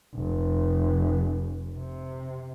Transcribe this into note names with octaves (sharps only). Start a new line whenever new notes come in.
F1
C3